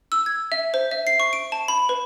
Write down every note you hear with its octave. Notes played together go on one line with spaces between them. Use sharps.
E6
G#6
E5
C5
E5
C7
C#6
D7
A5
B5
B4